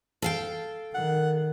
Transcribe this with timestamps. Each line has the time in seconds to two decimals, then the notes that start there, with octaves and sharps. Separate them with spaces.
0.22 A4 F5 G5
0.95 D#3 F#5